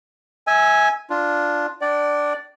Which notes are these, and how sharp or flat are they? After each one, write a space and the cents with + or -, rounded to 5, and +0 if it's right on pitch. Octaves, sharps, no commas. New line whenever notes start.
E5 -35 G#5 +0 E6 +0
D4 +0 F4 +0
D4 +0 D5 +0 G5 -45